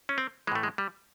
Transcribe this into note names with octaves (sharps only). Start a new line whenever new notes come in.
C#4
C4
A2 E3 G#3 A3
G#3
G3